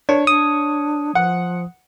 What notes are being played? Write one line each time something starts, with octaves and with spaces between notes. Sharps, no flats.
D4 C#5
D4 D#6
F3 F#5